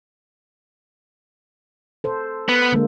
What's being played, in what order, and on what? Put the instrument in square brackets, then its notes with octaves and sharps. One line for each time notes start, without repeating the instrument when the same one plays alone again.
[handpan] A4 C5
[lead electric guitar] B3
[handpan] D3 G#3 A#3